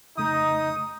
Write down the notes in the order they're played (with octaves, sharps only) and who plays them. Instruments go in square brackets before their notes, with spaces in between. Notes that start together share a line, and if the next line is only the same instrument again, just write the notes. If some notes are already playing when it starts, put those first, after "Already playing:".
[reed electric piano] F2 C#3 A3 [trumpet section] D#4 [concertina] D#6